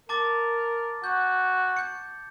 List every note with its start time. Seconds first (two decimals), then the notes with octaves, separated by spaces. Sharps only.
0.09 A#4 A5 D6 A6
1.04 F#4 G6
1.77 G6 C#7